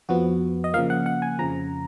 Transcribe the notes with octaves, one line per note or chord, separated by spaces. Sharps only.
F2 F3 B3 F#4
D#5
C#3 F3 A#3 F5
F#5
F#5
G#5
F2 C#3 F3 A#5